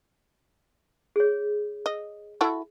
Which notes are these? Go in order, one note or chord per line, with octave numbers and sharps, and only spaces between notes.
G#4 C#5
D#5
E4 F#4 A4